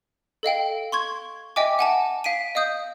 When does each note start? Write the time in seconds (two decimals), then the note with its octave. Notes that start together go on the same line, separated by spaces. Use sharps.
0.43 A4 D#5 F5 G5
0.92 C6 C#6 G#6
1.56 D#5 E5 G5 G#5 D6
1.79 F#5 G#5 A5
2.24 F5 B6 D7 D#7
2.55 D#5 F5 D#6 G6